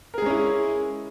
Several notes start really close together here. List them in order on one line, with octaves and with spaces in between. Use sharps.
A#4 G#4 G#3 C#4 E4